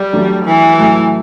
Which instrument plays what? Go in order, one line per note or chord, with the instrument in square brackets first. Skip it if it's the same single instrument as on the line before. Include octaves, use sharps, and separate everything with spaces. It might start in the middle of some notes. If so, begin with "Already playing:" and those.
Already playing: [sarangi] G3
[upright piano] F#3 A3 D4 G4
[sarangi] E3
[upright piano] A2 F#3 A3